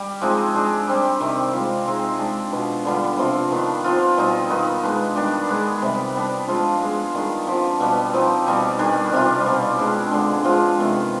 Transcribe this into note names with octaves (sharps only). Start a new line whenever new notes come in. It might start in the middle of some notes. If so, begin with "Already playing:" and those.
Already playing: G3 G4
F3 G#3 C4 D#4
G#3 D4 G4
G3 C4 G4
C3 D#3 G3
G#3 C4 F4
G#3 C4 D#4 G#4
G#3 D4 G4
B2 B3 F4 G#4
D3 G3 B3 F4
C3 F3 C4 F4
D#3 B3 D4
F3 C4 F4
B2 G3 C4 D#4
D#3 B3 D#4
G#3 B3 D4
D#3 G3 D4 G4
G#3 B3 D#4 G#4
C3 G3 B3
G3 B3 D4
F3 G#3 C4 F4
G#3 B3 F4
D#3 G3 D4 G#4
F3 C4 G4
B2 G3 B3
F3 C4 D#4 G4
B2 G3 C4 D#4
D#3 G3 D4 G#4
C3 G3 C4 F4
B2 G3 C4 D#4
G#3 D4 G4
D3 G#3 D4
F3 G#3 C4 F4
C3 D#3 G#3 B3